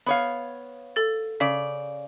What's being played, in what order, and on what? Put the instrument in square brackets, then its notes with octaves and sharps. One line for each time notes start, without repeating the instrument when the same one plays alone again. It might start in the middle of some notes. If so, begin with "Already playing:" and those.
[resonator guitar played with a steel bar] B3 C#5 F5
[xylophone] A4 A6
[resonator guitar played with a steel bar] C#3 D5 [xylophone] B6